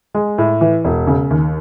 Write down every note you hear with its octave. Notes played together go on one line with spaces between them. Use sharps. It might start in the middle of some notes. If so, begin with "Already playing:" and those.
G#3
A2
E3
E1
C#3
D#2